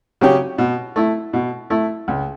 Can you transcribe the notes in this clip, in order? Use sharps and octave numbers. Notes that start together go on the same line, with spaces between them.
C#3 F#3 C#4 G4
B2
A3 E4
B2
A3 E4
C#2